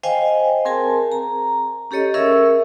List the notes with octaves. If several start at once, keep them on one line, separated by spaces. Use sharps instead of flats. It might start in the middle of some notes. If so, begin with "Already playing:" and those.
C5 D#5 F5 G5 G#5
C4 G#4 A#4 G#5 A5
A#5
C#4 G4 A4 C#5 D#5
C#4 G#4 A#4 E5 C#6 E6